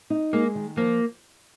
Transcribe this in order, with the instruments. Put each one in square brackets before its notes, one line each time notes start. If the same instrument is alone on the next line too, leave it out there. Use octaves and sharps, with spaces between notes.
[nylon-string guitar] D#4
[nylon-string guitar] G#3 [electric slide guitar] A#3
[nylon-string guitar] D#3
[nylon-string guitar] F3 [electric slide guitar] A#3